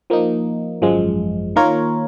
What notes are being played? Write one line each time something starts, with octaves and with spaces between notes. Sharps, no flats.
F3 A#3 D#4
G#1 F#2 F3 G#3
D#3 A#3 F4 A#4 C#5